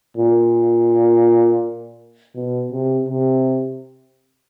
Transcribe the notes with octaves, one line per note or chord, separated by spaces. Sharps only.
A#2
B2
C3
C3